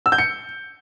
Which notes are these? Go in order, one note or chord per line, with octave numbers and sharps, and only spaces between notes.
E6
G6
C#7